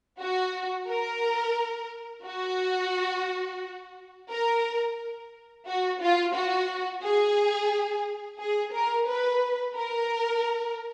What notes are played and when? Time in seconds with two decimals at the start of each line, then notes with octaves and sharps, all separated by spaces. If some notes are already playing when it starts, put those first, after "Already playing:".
0.19 F#4
0.88 A#4
2.25 F#4
4.30 A#4
5.67 F#4
6.01 F4
6.35 F#4
7.03 G#4
8.40 G#4
8.73 A#4
9.08 B4
9.76 A#4